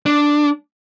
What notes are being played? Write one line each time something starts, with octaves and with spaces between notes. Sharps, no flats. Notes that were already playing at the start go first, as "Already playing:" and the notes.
D4